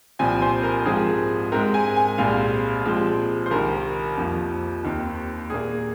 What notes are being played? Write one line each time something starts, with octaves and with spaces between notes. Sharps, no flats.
C2 A#2 F3 C4 G#5
C5
A#4
G#2 F3 C4 G#4
G#2 G#3 C4 A#4
G#5
G#5
C2 A#2 G#3 C4 F5
A#2 F3 G#3 C4
C5
C2 C3 D#3 A#4
F2 F3 A#3
D#2 D#3 C4
A#2 A#3 G#4